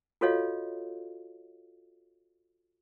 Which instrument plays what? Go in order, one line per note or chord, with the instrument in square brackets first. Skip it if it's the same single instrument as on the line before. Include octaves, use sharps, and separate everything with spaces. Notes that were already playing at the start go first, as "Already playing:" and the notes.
[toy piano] F4 F#4 A4 C#5 D#5 F5